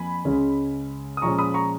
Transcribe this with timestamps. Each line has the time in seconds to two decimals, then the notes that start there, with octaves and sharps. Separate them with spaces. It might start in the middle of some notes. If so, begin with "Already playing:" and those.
Already playing: F2 F3 A#3 G#5 B5
0.25 C#2 C#3 G#3 C#4
1.17 D#6
1.22 A#2 F3 G#3 C#4 A#5 C#6
1.39 B5 D#6
1.54 A#5 C#6